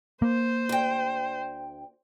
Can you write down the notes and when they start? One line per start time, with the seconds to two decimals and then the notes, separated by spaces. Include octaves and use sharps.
0.22 A#3 C5
0.69 D2 G5